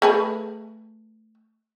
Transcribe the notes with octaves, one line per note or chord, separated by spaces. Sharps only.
A3 G#4 B4